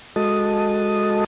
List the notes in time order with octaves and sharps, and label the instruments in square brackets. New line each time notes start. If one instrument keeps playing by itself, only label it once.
[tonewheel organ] G#3 F#4 A4 D#5 A5 D#6